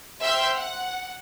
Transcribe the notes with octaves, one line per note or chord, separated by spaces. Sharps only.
C5 E5 G5 C6 F6 G6
F#5